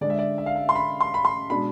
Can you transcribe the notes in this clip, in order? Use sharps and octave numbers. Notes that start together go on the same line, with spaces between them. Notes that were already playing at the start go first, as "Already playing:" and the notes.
D3 G#3 D4 D5
E5
D5
E5
F5
E5
C6
B5
C6
B5
C6
B2 G#3 D4 B5